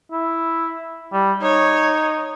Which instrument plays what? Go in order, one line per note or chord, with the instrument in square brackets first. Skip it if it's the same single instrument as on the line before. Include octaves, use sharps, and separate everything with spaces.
[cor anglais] E4
G3
[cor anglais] D#4 [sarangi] C#5